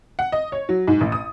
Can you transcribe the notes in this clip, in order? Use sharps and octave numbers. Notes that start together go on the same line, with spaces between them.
F#5
D#5
C#5
F#3
G#2
A1
D#6